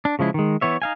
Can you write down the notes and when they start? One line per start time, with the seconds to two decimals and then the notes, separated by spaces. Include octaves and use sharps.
0.05 D4
0.19 C#3 F3 G#3 E4
0.34 D#3 G#3
0.61 E3 B3 C#5 E5
0.82 D#4 F5 G#5